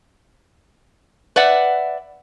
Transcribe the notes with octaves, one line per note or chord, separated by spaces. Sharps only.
B4 D5 E5 F#5